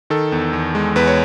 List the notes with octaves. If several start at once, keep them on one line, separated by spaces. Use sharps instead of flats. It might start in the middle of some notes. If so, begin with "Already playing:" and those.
D#3 A4
E2
E2
G#3
E2 B4
C#5